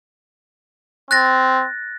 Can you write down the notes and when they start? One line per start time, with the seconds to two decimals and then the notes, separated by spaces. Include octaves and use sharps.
1.11 C4 F#6 A6 A#6